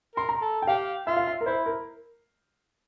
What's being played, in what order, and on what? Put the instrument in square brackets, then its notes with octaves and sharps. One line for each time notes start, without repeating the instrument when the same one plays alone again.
[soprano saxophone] A#4 [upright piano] C6
[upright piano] A#5
[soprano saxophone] A4
[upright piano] G5
[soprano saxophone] G4 [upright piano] F5
[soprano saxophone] F4 [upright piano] E5
[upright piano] F5
E5
A#4
[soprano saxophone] E4 [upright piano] C5
[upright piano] A#4